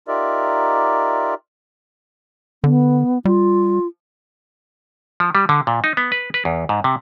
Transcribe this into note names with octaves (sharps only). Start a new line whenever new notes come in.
D#4 F4 G4 A#4 D5 E5
D3 B3
G3 F4
F3
G3
D3
A#2
D#4
B3
B4
B4
E2
G#2
C3